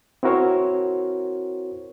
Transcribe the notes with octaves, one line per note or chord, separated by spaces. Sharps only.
C4 E4 F#4 A#4 C5 C#5